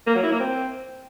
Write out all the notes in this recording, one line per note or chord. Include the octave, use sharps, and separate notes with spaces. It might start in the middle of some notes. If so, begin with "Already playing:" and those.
A#3
F#3
E4
A#3
C4